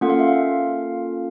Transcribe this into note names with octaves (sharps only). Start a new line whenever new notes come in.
A#3 C#4 F4 A4 F#5
F5
E5
F5